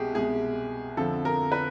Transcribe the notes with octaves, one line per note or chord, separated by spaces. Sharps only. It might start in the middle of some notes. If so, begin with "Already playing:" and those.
Already playing: C2 B2 G#3 G4 G#4
C2 B2 G#3 G#4
F2 D3 F3 A4
A#4
B4